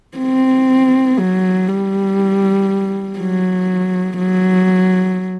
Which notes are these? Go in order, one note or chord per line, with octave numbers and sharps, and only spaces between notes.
C4
F#3
G3
F#3
F#3